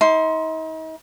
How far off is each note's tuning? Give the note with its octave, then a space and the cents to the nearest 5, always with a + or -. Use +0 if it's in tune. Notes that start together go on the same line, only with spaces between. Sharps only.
D#4 +40 C6 +0